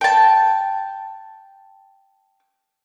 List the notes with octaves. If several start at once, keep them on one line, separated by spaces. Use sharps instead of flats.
G5 A5